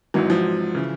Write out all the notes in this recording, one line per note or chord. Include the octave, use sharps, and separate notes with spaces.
G#1 G#2 E3 F#3
F3
C#3 E3